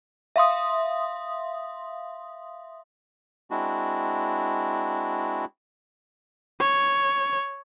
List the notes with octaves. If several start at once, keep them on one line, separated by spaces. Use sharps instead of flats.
E5 F5 C6 D#6
G#3 C4 D4 E4 F#4
C#5